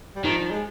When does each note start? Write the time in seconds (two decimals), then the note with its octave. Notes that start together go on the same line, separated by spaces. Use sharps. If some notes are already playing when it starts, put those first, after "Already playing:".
0.16 G3
0.24 D#3 F3
0.50 G#3